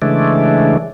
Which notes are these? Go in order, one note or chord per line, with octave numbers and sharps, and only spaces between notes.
C#3 E3 G#3 A3 D4